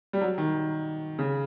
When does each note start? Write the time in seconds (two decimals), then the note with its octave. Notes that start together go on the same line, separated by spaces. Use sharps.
0.13 G3
0.21 F#3
0.38 D#3
1.19 C#3